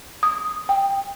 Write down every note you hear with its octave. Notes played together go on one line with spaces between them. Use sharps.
D#6
G5